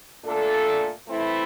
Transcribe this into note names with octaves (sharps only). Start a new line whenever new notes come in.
A#2 A3 D4 A4
E3 A3 C4 E4